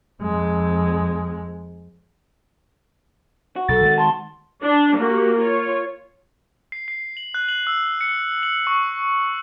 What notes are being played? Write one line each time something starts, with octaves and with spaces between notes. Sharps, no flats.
F2 G#3
F#4
B1 A4 A6
D#3 E3 G#3
A5 C6
D4
A#3 F#4 G4
F4 C#5
C7
C7
F#7
F#6
F#7
E6
C#7
F#7
C#6